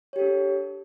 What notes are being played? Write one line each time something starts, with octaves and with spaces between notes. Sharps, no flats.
D4 G4 A4 C#5